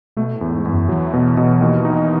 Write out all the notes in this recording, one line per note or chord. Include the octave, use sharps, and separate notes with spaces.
B2 A3
A2
E2
G#2
E2
F#2
E3 F#3
B2
B2
D#2
D#4